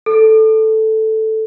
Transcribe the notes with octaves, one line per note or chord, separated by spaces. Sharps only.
A4